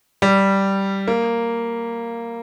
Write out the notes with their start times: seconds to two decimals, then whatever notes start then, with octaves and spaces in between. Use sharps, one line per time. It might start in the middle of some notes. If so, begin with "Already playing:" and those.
0.22 G3
1.08 A#3